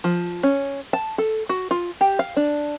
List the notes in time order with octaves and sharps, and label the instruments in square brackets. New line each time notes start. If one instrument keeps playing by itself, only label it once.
[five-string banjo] F3
C#4
A5
A4
F#4
F4
G4
F5
D4